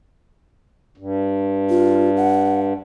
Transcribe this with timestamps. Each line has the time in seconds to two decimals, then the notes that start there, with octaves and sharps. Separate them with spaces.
0.98 G2
1.70 F4
2.17 F#5